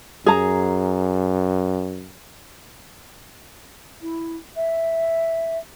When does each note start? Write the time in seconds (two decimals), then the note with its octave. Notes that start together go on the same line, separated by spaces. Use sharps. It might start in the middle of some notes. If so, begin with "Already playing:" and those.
0.26 F#2 G#4 A#5
4.02 E4
4.56 E5